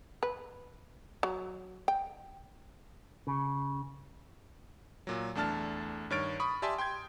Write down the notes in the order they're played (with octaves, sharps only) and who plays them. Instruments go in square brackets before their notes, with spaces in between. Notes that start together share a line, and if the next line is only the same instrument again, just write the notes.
[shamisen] B4
F#3
G5
[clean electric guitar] C#3
[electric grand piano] A#2 F#3
E2 A3 D4 A5 F6 A6
G2 D#3 C#5 F6 A6 D7
B5 C#6 D#6
G4 D5 E5 G#5 A5 C6
G5 C6 G6 G#6